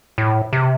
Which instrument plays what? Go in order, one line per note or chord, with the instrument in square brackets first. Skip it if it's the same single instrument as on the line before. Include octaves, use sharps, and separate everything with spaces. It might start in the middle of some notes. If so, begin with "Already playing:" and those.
[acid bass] A2
C3